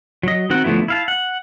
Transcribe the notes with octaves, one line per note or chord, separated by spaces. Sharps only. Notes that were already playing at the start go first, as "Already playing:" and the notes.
F#3 D#5
D#3 C4 F#4 F#5
D3 F3 A3 B3 E4
E4 F5 A5
F#5